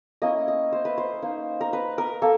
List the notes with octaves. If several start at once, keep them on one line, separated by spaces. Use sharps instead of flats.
A#3 C#4 E4 D#5
D#5
C5
B4
C5
A#3 D#4
A#4
B4
A#4
A#3 A4